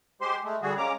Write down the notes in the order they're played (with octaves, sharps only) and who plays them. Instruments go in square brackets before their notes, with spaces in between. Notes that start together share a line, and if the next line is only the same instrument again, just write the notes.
[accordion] G#3 G4 C5 C6
G#3 A3
D3 G3 F#4 G#4
G#3 A#3 C#4 A#5 D6